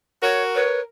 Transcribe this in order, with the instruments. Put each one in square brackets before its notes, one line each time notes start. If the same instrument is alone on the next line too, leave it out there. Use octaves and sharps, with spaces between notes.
[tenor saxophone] F#4 [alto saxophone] A#4 [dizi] C#5
[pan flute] B4 [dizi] C#5